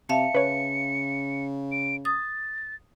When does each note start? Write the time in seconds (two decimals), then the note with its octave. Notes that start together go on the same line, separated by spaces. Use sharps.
0.09 C3 E5 F5 A5 C#7
0.35 C#3 B4 C#5
1.72 D7
2.05 D#6 A6